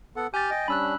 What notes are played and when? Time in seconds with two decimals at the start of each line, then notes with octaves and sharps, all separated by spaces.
0.16 B3 A4 F#5
0.34 G4 G#5 F6 G6 A6
0.50 D#5 G5
0.68 G3 C#4 D4 B5 E6 F#6